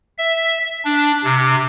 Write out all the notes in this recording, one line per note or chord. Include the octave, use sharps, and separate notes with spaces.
E5
D4
C3